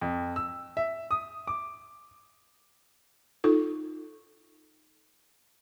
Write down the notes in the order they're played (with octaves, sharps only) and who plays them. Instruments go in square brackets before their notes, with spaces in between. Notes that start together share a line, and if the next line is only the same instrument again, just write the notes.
[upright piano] F2
E6
E5
D#6
D6
[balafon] D#4 F4 A4